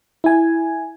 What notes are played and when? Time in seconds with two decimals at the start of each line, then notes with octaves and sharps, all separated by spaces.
0.24 E4 G#5